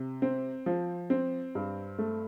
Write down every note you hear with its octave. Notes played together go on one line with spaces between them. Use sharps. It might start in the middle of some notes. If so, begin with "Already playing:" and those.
Already playing: C3
C4
F3
C4
G2
A3